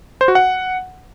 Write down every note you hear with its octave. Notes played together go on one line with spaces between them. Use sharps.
C5
F#4
F#5